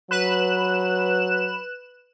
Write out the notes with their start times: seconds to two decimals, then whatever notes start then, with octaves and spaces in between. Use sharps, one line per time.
0.11 F#3 B4 F#6 E7